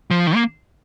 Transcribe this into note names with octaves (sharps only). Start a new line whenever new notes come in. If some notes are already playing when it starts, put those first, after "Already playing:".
F3
D#3
A#3